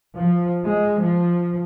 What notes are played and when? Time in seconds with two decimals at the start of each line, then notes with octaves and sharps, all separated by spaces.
0.18 F3
0.66 G#3
1.02 F3